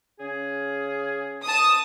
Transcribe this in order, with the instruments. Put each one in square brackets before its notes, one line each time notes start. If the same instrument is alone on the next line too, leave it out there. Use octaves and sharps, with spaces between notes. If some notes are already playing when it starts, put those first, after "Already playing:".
[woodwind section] C#3 C#4 G#4
[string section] A5 D#6